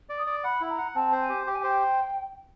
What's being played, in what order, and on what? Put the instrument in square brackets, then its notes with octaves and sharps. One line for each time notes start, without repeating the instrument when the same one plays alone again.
[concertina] D5
[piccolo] D#6
[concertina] D5
[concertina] F#5 [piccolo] B5
[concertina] E4
[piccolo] A#5
[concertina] F#5
[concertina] C4 [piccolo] A5
[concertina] C5
[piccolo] G#5
[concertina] G4
[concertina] G4 [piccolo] G5
[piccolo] G#5
[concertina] C5 [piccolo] G5